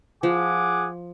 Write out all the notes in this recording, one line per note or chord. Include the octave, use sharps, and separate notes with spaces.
F3 G#4 F#5 D6